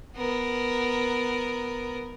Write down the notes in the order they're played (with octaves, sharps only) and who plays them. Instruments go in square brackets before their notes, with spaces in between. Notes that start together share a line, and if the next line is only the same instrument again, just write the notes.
[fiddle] B3 A#4